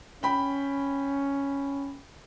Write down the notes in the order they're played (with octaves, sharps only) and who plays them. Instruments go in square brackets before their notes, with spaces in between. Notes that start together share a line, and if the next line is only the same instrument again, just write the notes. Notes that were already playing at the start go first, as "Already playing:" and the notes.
[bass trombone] C#4 [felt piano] G5 B5